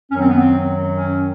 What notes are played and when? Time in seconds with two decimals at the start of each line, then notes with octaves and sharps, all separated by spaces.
0.11 F#2 D#3 F#3 C#4
0.21 C4
0.29 B3
0.39 C4
0.93 C#4